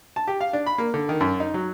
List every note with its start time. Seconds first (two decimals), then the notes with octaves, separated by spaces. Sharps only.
0.16 A5
0.28 G4
0.41 F5
0.53 D4
0.66 B5
0.78 A#3
0.94 D3
1.09 D#3
1.21 F#2
1.40 D#4
1.54 F#3